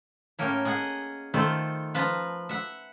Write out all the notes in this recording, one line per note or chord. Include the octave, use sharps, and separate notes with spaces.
A2 A#3 C#4 G5
G#4 D#5 F#5
D#3 A3 F4 A4 C5
F3 B4 F5 A5 A#5
E5 F#5